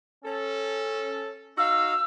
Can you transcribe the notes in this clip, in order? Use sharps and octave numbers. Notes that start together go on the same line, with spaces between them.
C#4 A4
D#4 F#4 F5 E6